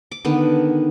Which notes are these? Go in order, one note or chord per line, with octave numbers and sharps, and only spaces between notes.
D6
D3 D#3 B3